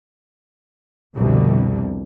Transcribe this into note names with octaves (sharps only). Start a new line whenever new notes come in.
C2 F2 B2 D3